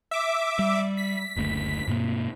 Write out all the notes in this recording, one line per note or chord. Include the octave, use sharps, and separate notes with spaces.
E5 D6
G3
B6
F#1 D2 A3
G2 B2 A#3